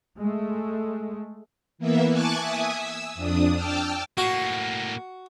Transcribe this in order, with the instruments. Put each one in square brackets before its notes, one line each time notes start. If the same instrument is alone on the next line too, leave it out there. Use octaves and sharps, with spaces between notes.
[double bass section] G#3 A3
[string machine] E3 A#3 B3 E5
G#5 A5 C#6 D6 F#6 A6
E5 G#5 D#6
E6
F2 D4 D#6
G5 A5 D6 E6 F6
[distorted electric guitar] A2 A#3 [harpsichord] F#4